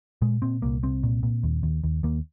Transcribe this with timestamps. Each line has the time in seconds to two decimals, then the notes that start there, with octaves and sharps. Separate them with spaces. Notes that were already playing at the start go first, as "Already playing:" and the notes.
0.22 A#2 G#3
0.42 A#2 C4
0.62 C2 A#3
0.83 C2 C4
1.03 A#2
1.23 A#2
1.43 D#2
1.63 D#2
1.84 D#2
2.03 D#2 A#3